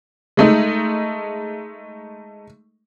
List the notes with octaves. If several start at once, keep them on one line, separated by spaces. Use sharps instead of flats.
G#3 A3 D#4